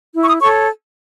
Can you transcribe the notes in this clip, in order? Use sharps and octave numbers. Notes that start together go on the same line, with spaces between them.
E4
C#6
D#6
A4 C#5 C#6